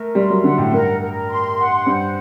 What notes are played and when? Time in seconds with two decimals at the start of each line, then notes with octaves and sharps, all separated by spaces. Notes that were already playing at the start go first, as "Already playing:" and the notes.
Already playing: A3 A#4
0.15 G3 C6
0.30 F#3
0.44 D3 F#5
0.58 A2
0.72 G2 A#4
1.00 A#4
1.29 C6
1.58 F#5
1.86 G2 C5